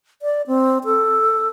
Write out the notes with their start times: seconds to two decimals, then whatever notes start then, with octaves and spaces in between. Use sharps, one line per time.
0.22 D5
0.47 C4
0.85 A4